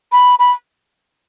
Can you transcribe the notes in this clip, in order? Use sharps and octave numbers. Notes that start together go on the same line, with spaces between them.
B5
B5